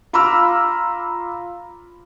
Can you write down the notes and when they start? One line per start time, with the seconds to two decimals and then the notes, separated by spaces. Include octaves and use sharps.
0.13 F4 A#5 B5 D6 E6 F6